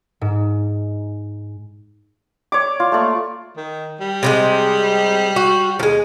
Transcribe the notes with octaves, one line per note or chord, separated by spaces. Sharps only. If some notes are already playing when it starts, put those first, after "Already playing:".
G#2
C#5 D5 D6
F4
A3 A#3 D5 C#6
D#3
G3
C3 F3 G#3
F#4
D#2 F3 G#3